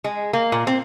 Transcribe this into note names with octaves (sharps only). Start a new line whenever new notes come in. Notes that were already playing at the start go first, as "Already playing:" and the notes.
G#3
A#3
A#2
C4